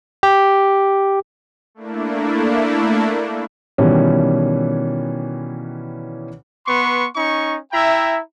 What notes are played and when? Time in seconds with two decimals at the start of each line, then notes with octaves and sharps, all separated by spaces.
0.23 G4
1.75 A3 A#3 D4 E4
3.78 B2 D#3 E3 G3 C#4 E4
6.67 B3 B4 C6 C#6
7.16 C#4 D#4 C#6
7.72 E4 E5 G5 A#5